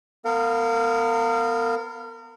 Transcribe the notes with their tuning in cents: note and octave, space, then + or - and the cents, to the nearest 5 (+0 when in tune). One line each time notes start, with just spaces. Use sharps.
B3 +0 A#4 -35 F5 +0